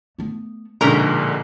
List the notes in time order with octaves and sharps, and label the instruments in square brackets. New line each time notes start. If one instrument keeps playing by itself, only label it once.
[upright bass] A3 B3
[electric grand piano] A#1 G#2 D3 [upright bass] B2 [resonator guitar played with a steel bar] C#4 A#4 A#5